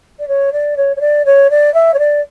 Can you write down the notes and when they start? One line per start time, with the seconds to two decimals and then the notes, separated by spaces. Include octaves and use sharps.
0.19 D5
0.28 C#5
0.53 D5
0.77 C#5
0.96 C#5
1.01 D5
1.26 C#5
1.51 D5
1.74 E5
1.94 C#5
1.99 D5